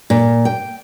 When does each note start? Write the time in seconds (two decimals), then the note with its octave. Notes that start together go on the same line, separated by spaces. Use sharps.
0.10 A#2
0.45 G5